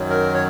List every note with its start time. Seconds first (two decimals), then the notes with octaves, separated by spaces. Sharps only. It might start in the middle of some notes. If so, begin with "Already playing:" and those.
Already playing: F#2 D#3 F#3
0.10 A#4
0.34 C#5